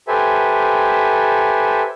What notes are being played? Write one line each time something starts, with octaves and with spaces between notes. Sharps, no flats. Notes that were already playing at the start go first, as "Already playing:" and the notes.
G4 A4 B4 C5 E5 G#5